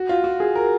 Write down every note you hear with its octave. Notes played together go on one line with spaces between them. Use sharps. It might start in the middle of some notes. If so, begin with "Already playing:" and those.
Already playing: F#4
F4
F#4
G#4
A#4